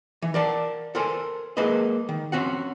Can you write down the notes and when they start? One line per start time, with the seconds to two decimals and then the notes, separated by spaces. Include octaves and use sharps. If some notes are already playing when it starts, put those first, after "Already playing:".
0.22 E3
0.34 A#4 D5 A5
0.95 A4 A#4 C5 G#5
1.57 G#3 A#3 A#4 B4 D#5
2.09 D#3
2.32 C4 C#4 F#4 F#5